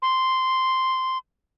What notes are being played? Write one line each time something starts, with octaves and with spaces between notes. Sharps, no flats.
C6